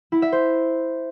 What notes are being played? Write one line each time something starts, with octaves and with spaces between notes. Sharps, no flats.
E4
E5
C5